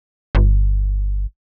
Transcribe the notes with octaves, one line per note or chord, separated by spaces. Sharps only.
G1